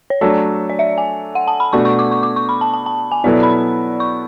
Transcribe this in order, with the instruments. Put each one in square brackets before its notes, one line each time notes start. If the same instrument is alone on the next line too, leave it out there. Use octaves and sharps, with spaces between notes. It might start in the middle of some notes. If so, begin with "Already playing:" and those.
[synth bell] C#5
[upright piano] F#3 A3 D4 A4 [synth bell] D5
[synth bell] D5
E5
G#5
F#5
A5
B5
[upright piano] B2 A3 D4 F#4 [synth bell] C#6
[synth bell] C#6
D6
C#6
D6
C#6
B5
A5
A5
A5
G#5
[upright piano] B2 F#3 B3 E4 A4 [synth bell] D5
[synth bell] B5
C#6